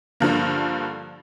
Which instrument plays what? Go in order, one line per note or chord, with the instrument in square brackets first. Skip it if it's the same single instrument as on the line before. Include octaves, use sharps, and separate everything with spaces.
[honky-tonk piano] G2 D3 F3 A#3